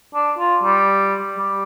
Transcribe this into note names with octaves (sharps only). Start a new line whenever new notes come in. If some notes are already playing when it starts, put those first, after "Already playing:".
D4
F4
G3
G3